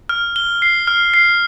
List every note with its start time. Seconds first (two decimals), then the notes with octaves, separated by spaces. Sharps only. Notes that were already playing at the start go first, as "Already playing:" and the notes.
0.09 F6
0.36 G7
0.62 C7
0.88 F6
1.14 C7